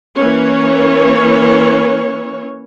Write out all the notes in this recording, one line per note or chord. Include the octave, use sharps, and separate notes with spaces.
E3 A#3 C#4 C#5